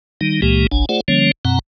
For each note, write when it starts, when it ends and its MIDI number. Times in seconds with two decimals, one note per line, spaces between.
0.21 0.41 51
0.21 0.41 55
0.21 0.41 63
0.42 0.67 37
0.42 0.67 46
0.42 0.67 52
0.42 0.67 56
0.42 0.67 58
0.42 0.67 67
0.72 0.85 30
0.72 0.85 35
0.72 0.85 62
0.72 0.85 80
0.89 1.01 57
0.89 1.01 65
0.89 1.01 68
0.89 1.01 72
0.89 1.01 74
0.89 1.01 78
1.08 1.31 50
1.08 1.31 53
1.08 1.31 55
1.08 1.31 58
1.08 1.31 61
1.08 1.31 73
1.45 1.59 42
1.45 1.59 47
1.45 1.59 60
1.45 1.59 78
1.45 1.59 82